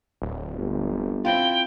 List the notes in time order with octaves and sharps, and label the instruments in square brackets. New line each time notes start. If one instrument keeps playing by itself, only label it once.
[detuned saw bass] D1
[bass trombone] G1
[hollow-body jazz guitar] C4 E4 F4 [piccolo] G5